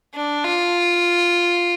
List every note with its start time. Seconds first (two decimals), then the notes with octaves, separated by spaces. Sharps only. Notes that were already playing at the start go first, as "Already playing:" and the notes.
0.15 D4
0.44 F4